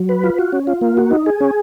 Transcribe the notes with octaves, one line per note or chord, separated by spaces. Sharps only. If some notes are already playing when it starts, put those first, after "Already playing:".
Already playing: F#3
B4
F4
F#4
C#4
F4
A#3
F#4
D#4
G#4
C#4